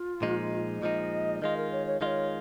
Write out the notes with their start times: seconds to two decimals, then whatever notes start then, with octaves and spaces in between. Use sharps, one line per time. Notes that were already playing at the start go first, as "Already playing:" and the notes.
Already playing: F4
0.22 A#2 F3 G#3 D#4
0.81 A#2 F3 G#3 D#4 D#5
1.41 D#3 G#3 F4 D#5
1.57 A#4
1.72 C#5
1.86 C#5
2.01 D#3 G#3 F4 C#5 D#5